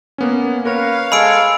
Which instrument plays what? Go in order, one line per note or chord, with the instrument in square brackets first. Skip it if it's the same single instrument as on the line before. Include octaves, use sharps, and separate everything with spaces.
[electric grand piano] A#3 B3 C#4
[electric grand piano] A#4 [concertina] B4 [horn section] C#5 F5
[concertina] G#3 A4 G#5 [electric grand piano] D#5 [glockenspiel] B5 E6 D7